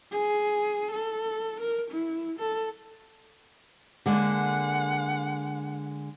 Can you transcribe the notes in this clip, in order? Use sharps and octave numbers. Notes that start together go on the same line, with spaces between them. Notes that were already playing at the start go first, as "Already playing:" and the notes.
G#4
A4
A#4
E4
A4
D3 G#3 A#3 F#5